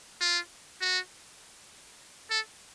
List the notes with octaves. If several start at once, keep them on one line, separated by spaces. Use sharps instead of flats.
F4
F#4
A4